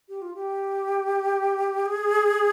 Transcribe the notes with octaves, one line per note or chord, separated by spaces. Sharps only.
G4
F4
G4
G#4